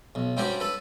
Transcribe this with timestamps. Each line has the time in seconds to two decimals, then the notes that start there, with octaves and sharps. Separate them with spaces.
0.15 B1
0.37 G2 G3 C4 C#4 F#4 G4
0.60 A4 B4